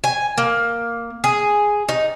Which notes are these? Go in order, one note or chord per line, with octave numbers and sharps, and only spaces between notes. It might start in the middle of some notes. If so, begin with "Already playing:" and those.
G#5
A#3
G#4
D#4